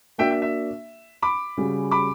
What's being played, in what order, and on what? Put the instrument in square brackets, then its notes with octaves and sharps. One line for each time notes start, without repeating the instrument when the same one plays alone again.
[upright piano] A#3 D4 F#4 [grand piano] E5 G5
[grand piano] E5
E5
B5 D6
[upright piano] C#3 G3 C#4 F#4
[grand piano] B5 D6